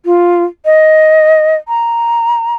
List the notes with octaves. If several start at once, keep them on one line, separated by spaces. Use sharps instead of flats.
F4
D#5
A#5